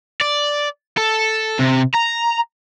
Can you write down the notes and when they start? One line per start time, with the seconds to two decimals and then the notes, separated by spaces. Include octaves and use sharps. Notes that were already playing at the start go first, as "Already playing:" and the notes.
0.21 D5
0.97 A4
1.59 C3
1.94 A#5